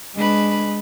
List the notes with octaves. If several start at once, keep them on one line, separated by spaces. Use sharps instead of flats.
G#3 D4 B4